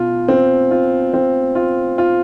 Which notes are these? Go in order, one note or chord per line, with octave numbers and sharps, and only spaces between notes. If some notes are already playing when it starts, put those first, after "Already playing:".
Already playing: B2 F4
C4
F4
C4
F4
F4